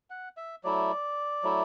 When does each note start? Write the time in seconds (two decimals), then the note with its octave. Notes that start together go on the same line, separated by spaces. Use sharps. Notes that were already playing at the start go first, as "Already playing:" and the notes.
0.10 F#5
0.37 E5
0.64 F#3 A3 E4 D5
1.43 F#3 A3 E4